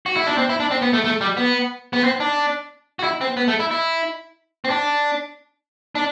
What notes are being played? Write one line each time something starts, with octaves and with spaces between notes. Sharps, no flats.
F#4
E4
D4
C4
E4
D4
C4
B3
A3
A3
G3
B3
B3
C4
D4
F#4
E4
C4
B3
A3
E4
E4
C4
D4
D4